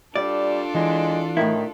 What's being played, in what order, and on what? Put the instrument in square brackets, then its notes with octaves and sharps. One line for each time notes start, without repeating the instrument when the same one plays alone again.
[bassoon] G3 [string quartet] D4 F4 A4 [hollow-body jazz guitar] D5
[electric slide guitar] E3 [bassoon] G#3
[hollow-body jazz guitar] A2 E4 [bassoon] D#3